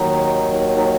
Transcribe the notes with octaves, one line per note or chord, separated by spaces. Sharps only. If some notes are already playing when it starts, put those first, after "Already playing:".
Already playing: D#2 D#3 F#3 D#4
D#4